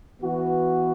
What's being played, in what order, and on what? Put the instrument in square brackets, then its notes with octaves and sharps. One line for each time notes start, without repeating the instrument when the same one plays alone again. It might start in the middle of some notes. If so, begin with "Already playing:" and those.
[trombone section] E3 B3 F#4